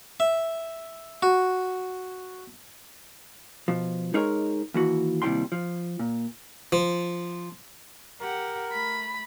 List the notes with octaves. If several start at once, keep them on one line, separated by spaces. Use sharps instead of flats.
E5
F#4
B2 F3
G#3 D#4 G#4 A#4 C#5
D#2 E3 F#4
D#2 C3 G3 E4 G5 C6
F3
A#2
F3
G4 A#4 F#5
A3 B5